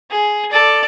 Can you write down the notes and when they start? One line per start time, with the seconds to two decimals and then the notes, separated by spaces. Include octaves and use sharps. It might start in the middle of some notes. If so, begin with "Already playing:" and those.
0.11 G#4
0.52 A4 D5